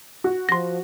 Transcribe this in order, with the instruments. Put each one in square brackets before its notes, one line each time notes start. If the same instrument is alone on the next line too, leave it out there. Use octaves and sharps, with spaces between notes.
[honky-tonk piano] F#4
[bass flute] F3 [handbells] C6 A#6